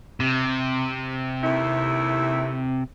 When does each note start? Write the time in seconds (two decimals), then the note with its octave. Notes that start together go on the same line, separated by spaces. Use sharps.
0.20 C3
1.43 D#2 A3 E4